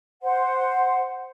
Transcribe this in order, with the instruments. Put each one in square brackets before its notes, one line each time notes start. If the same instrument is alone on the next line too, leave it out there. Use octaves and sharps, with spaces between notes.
[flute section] C5 F#5 C6